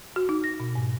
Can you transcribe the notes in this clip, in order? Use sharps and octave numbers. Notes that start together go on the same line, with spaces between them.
F#4
D#4
A#6
B2
G#2